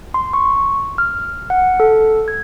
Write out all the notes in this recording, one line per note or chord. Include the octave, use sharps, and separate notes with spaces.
C6
C#6
F6
F#5
A4
G#6